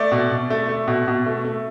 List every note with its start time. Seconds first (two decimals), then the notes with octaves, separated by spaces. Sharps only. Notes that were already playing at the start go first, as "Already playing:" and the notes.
Already playing: A3 D5
0.12 B2
0.31 B2
0.50 A3
0.69 A3
0.88 B2
1.08 B2
1.26 A3
1.45 A3